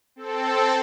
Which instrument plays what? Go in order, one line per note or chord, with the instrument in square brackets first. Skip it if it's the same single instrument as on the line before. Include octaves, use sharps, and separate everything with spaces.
[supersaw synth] C4 A4